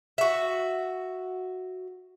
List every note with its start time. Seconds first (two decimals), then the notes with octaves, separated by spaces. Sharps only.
0.18 F#4 E5